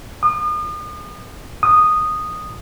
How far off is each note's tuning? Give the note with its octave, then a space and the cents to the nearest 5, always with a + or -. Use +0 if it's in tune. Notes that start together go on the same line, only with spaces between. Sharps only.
D#6 -40
D#6 -10